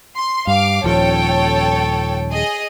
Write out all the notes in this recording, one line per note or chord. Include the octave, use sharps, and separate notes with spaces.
C6
G2 F5 D6
D#1 F3 A4 C#5 G5
G#4 D#5